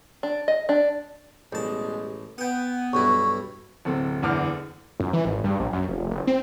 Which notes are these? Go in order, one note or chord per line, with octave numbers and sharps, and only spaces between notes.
D4
D#5
D4
A1 B2 G3 G#3 A5
B3 F#5 G5
B1 G2 E4 C#6
D1 C3 C4 A4
F#1 E2 D3 D6 F6
F#2
E3
G#1
G2
A#1
F#2
F1
F#1
C4